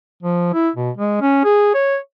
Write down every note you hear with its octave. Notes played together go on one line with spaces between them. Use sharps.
F3
E4
B2
G#3
C#4
G#4
C#5